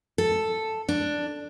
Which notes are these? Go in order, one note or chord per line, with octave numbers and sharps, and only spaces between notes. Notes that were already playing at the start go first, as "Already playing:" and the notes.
A4
D4